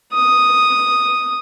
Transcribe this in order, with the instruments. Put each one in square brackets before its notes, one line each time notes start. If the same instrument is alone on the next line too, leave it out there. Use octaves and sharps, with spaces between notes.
[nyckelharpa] D#6